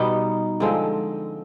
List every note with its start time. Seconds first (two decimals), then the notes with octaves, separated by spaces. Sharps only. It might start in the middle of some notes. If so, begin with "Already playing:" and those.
Already playing: B2 G3 B3 D#4
0.60 D3 F3 G#3 C4